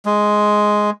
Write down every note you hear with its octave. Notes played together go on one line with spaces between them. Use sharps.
G#3